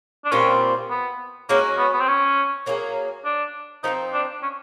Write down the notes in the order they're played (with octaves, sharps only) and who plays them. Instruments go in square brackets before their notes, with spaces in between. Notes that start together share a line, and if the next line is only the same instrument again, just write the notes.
[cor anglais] D4
[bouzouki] A#2 G3 C4 F4 [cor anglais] C#4
[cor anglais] B3
[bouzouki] G#3 C#4 F#4 [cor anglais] A#3
[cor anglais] B3
B3
C4
C#4
[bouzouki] F#3 A#3 D#4 G#4
[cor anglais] D4
[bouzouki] F3 A3 C4 [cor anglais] D#4
[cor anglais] D4
C#4